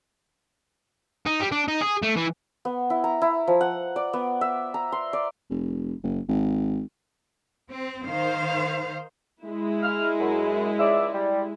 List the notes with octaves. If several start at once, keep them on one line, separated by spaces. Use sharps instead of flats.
D#4
G3
D4
D#4
G#4
A3
E3
B3
E4
A#5
E4
F3
F#5
D5
B3
E5
A#5
C6
D5
F1
F#1
G#1
C4
D#3 C5 F5
G#3 E4
F6
F#2
C#2 D5 E5
G3